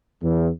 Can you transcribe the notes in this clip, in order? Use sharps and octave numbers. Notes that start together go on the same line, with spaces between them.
E2